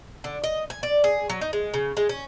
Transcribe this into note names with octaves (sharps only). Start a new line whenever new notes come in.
D3
D#5
G#5
D5
G#4
F#3
D#4
G#3
C#3
G#3
C#4